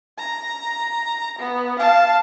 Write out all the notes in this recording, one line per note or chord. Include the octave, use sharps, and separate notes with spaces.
A#5
B3
F5 A5